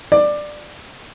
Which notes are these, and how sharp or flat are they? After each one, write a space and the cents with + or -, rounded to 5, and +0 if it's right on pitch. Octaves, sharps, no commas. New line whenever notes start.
D5 +15